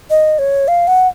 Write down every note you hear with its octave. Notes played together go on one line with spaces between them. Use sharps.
D#5
C#5
F5
F#5